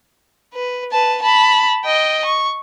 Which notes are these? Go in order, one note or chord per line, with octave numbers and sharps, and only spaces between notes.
B4
B4 A5
A5 B5
D#5 G5
C#6